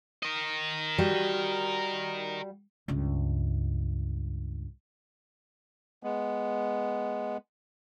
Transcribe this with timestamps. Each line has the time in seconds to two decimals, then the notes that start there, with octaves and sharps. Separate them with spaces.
0.23 A#4 D#5
0.98 G3 F#4
2.88 C#2 G2
6.03 G#3 B3